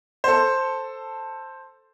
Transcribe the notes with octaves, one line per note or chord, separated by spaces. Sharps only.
A4 C5